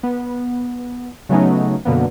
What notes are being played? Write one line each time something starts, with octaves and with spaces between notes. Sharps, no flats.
B3
C#3 F#3 A3 B3 C#4 D#4
F#2 B2 D3 A#3 B3